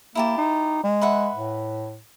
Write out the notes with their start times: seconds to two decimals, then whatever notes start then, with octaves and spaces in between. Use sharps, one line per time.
0.15 A#3 E4 G4 A5
0.38 D#4
0.84 G#3
1.01 B4 E5 F#5
1.35 A2